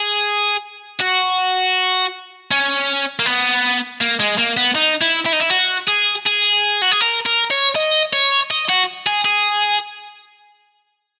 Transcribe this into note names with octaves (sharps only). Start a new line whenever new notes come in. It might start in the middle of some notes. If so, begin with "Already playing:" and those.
Already playing: G#4
F#4
C#4
A#3
B3
A#3
G#3
A#3
B3
D#4
E4
E4
D#4
E4
F#4
G#4
G#4
F#4
G#4
A#4
A#4
C#5
D#5
C#5
D#5
F#4
G#4
G#4